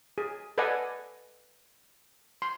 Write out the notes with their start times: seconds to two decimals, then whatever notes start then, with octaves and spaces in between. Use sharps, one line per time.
0.18 G#4
0.58 A4 B4 D5 D#5 F#5 G#5
2.42 C6